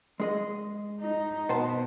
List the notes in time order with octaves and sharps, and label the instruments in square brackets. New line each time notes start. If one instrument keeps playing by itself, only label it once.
[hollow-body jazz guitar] G#3 G#4 D#5
[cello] D#4
[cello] B2 [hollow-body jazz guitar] B3 C5 A5